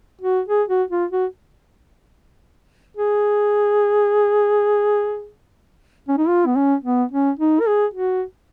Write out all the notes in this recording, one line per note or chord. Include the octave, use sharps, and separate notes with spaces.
F#4
G#4
F#4
F4
F#4
G#4
C#4
D#4
F4
B3
C#4
B3
C#4
D#4
A#4
G#4
F#4